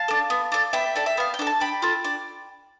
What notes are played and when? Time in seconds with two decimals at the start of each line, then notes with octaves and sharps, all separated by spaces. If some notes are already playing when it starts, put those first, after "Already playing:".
Already playing: F5 A5
0.08 D4 A4
0.30 B3
0.52 D4 A4
0.73 B3 E5 G5
0.96 D4 A4
1.06 E5
1.17 B3 F5
1.34 G5
1.39 D4 A4
1.47 A5
1.60 D4 G5 B5
1.82 F4 A4
2.04 D4